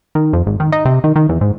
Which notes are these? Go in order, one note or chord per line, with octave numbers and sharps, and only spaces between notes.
D#3
F2
G#1
D#3
D#4
C3
D#3
D#3
E2
G#2